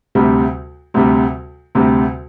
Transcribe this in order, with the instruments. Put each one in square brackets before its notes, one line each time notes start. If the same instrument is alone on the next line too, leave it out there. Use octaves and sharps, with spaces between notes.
[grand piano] D2 C3 G3
D2 C3 G3
D2 C3 G3